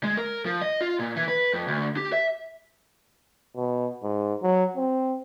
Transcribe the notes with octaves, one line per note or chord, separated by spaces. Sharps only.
G#3
A#4
F3
D#5
F4
A#2
E3
B4
F2
D2
G4
E5
B2
G#2
F#3
C4